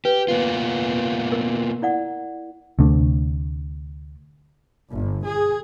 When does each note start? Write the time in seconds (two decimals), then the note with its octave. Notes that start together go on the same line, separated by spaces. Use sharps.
0.05 G4 B4
0.28 A#3 B3 F4
1.32 A#4
1.82 E4 D5 F#5
2.79 D2 C3 A3 D4
4.90 G1
5.25 G#4